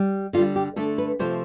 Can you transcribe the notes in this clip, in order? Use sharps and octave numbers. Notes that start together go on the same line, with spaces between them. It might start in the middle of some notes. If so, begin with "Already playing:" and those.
Already playing: G3
D3 G3 F4
G4
D3 A3 A4
B4
C3 F3 A3 C5